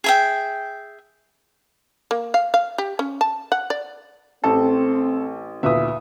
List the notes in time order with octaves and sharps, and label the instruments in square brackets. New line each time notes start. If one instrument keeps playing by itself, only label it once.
[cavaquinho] G#4 E5 G5
[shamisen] A#3
F5
F5
G4
C#4
A5
F#5
D5
[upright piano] A1 [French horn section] C4 [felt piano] A4
[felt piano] D2 A#2 B3 [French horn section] E3 [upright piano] E5 D#6